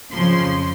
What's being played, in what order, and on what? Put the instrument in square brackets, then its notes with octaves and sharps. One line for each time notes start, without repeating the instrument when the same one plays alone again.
[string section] F2 C#3 F3 C6